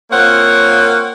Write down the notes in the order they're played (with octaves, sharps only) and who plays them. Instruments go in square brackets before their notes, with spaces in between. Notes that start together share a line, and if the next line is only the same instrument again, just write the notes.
[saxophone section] A#3 C4 F4 C#5 F#5